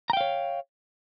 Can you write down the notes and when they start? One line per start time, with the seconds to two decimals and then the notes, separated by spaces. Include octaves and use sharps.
0.10 A#5
0.13 G5
0.17 F5
0.21 C#5